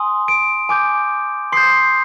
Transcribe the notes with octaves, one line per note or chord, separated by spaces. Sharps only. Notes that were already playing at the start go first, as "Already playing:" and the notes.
Already playing: G#5 C6 D#6
D7
G#5 D6 G6
C6 D#6 G6 C7